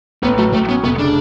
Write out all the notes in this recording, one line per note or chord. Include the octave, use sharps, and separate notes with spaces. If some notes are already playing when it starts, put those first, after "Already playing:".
A1 B3
F#3 A3
A1 A3
B3 C#4
F1 B3
C#3 D4